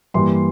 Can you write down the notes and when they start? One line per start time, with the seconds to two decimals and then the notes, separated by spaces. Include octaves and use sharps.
0.14 G2 E3 G3 A#3 C6